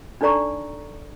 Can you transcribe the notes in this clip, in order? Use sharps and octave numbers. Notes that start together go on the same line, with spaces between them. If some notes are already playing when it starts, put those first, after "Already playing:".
D4 D#4 A4 D5 A#5 C#6